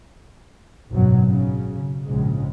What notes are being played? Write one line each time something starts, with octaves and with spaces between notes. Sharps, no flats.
G#1 F#2 B2 F#3
C#3
A#1 G#2 C#3 G#3